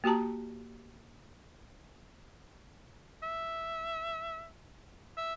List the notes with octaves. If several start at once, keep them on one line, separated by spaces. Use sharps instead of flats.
A#3 F#4 G4 A5 A#5
E5
E5